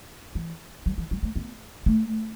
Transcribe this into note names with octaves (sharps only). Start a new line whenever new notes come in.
E3
F#3
E3
F#3
A3
B3
A3